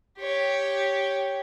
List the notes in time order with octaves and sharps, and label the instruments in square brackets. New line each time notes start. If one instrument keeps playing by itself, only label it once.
[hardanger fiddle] G4 C#5